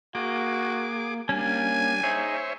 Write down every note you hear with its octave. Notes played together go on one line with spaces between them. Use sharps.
A#3 F#4 G#4 D6
G3 A#3 C#4 D4 G#5
D#4 G#4 C5 C#5 E5